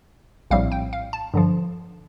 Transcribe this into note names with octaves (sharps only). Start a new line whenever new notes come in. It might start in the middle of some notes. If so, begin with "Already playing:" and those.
A#1 A2 G3 C4 F5
G5
F5
A5
G2 D3 F3